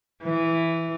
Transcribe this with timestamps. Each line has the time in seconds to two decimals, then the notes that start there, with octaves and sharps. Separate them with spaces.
0.24 E3